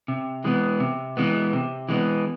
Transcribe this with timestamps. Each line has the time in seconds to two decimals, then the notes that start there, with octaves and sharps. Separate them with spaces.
0.08 C3
0.44 E3 G#3 B3
0.80 C3
1.17 E3 G#3 B3
1.53 C3
1.89 E3 G#3 B3